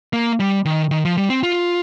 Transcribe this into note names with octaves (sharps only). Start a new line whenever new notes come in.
A#3
G3
D#3
D#3
F3
G3
C4
F4